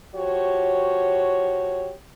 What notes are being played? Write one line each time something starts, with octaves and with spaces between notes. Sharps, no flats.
F3 F#4 G4 C#5